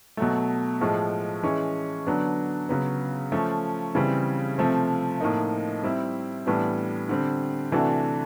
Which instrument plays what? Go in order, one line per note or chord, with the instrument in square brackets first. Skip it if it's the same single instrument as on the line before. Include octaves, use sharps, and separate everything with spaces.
[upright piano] B2 F#3 A3
A2 F3 G#3
E3 G#3 C#4
D3 F#3 B3 D4
C#3 F#3 B3
F3 A3 C#4
C#3 E3 G3 C4
C3 F3 A3 C4
A2 F3 A#3 D#4
G3 C4 E4
A2 E3 G3 B3 D4
D3 G3 C4
C3 E3 A3 D4 F#4